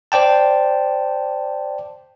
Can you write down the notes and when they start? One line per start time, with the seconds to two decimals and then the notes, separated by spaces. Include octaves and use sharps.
0.12 C5 D5 G5 A5